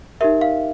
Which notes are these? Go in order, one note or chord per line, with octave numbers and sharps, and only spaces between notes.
D#4 G4 A#4 E5
F5